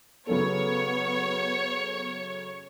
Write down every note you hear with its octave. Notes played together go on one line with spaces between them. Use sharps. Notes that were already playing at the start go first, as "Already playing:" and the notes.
C#3 F#3 B3 A4 C#5